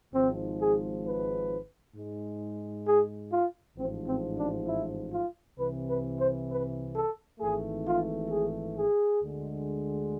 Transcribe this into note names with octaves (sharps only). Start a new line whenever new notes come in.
G#1 G#2 F3 G#3 C4
G#4
B4
G#2 G#3
G#4
F4
A1 G#2 F3 C4
C4
D4
E4
F4
C2 C3 E3 B4
B4
C5
B4
A4
G#1 G#2 E3 A3 G#4
F4
G#4
G#4
D2 D3 G#3